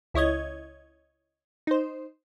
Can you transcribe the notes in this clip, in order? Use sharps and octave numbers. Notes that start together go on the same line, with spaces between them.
C#2 E4 C#5 D#5 G#6
D#4 C5